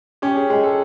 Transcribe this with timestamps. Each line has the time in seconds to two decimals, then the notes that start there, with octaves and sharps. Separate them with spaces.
0.22 C#4 G4
0.36 G#4
0.50 G#3 G#4
0.63 A4